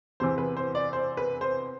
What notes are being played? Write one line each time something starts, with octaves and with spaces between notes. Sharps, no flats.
E2 C3 E3 C5
B4
C5
D5
C5
B4
C5